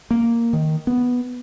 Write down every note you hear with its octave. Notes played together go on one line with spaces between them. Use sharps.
A#3
D#3
B3